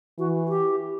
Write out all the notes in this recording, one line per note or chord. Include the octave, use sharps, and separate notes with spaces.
E3 F#4
G4